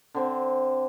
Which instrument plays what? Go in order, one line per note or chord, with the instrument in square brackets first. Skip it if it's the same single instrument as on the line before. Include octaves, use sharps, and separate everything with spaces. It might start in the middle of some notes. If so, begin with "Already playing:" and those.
[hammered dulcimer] D3 C4